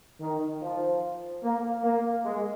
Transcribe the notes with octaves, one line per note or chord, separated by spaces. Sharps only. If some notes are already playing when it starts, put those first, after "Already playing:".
D#3
F3
A#3
A#3
G#3